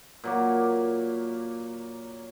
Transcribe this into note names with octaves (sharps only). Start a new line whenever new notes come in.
A#2 F#3 A#3